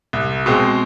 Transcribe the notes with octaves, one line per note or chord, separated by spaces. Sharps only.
C2
B2 G#3 C4